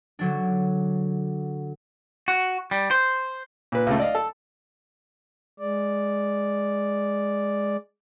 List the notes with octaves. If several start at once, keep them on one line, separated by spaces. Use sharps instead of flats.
D3 F#3 D4
F#4
G3
C5
A#2 B4
C#2 C#3 A3
D5 D#5 F5
A4
G#3 D5